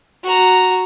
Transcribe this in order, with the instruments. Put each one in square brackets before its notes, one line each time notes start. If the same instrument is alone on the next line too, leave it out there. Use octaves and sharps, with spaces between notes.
[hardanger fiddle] F#4 A#5